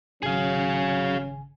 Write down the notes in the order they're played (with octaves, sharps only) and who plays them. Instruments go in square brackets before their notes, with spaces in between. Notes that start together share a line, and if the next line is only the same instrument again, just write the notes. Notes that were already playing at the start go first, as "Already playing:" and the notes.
[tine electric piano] G#1 C#3 G#5 [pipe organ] F#3 [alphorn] C#4 [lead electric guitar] G#4 F5